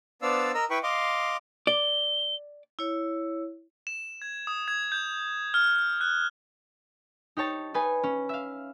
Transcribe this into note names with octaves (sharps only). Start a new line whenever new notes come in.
B3 D4 C5 D5 F5 E6
A#4 D#5 A#5 E6
E4 B4 G5 B5 C#6
D#5 F5 C6 D6
D5 G7
E4 C#5
E7
G#6
D#6
G#6
G6
F6
F#6
D#4 G4 C#5 A5
D#4 B4 G#5
C#4
E5 F5